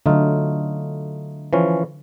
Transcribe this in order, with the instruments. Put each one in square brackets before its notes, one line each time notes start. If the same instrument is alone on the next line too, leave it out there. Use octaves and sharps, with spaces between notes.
[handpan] D3 F#3 [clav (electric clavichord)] A3 D#4 F4
[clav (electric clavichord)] E3 F3 C#4